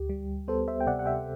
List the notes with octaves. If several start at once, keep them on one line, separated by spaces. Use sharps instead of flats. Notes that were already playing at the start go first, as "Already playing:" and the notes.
Already playing: D2 G4
G3
B3 A4 C5
C5 E5
G5
C3 D5 F#5
F#5
E5 G5